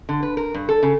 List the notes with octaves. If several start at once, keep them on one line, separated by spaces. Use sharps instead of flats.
D3
B4
A#4
G2
A4
C#3